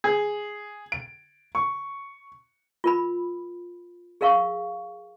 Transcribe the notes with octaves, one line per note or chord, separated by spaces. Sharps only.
G#4
D7
C#6
F4 A#4 B5
G#4 A#4 E5 F5 C#6